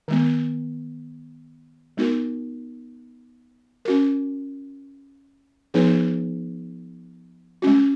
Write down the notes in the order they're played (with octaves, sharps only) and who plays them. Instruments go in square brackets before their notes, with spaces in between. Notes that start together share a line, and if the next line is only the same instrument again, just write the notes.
[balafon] D#3 G#3 B3
G#3 B3 D#4 F#4 A#4
C#4 F#4 A#4
F3 B3 D#4 G#4 B4
G#3 C#4 F#4